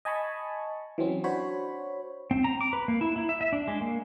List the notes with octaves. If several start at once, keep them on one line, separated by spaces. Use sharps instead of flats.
D#5 G#5 A5 B5 C#6
E3 F#3 C4 C#4
D4 F#4 C5 C#5 B5
C4
A#5
D6
B4
A#3
E4
E4
E5
E5
D4
G#3
A#3